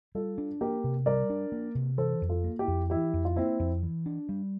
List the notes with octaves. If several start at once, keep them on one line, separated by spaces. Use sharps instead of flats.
G3 F4 A4
D4
A#3 G4 A#4
C3
G3 A#4 D5
D4
A#3
C3
E3 A4 C5
F2
F4 A4
A#3
E4 G4
F2
E3 E4 G4
F2
F4
A#3 C4 E4
F2
E3
D4
G3